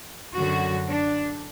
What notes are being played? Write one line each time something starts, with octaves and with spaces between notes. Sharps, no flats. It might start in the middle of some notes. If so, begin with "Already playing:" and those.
F#2 D3 F#3 F#4
D4